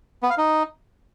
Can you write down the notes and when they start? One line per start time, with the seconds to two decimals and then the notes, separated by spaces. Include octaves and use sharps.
0.23 B3
0.30 F5
0.38 D#4